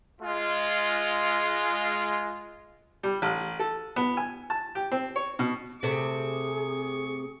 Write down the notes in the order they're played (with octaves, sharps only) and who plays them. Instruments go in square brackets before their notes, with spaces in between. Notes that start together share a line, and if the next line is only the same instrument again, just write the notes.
[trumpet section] G#3 F4
[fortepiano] G3
A1
A4
B3
G#5
A5
G4
C4
C#5
B2
[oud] C3 A3 C4 [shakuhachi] G#4 [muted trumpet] C#6